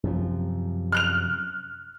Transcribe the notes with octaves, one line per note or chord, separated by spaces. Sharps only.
F#2 C3 F3
F6 F#6 F7